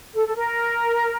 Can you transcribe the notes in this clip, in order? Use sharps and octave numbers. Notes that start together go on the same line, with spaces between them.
A4
A4
A#4